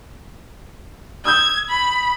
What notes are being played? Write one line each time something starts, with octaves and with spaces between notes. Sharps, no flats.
D#6 E6 G6 G#6
B5